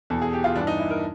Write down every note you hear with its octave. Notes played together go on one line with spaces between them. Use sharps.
E2 B2 A4
G#4
G4
F4
G2 E3 D4
D#4
E4
A#4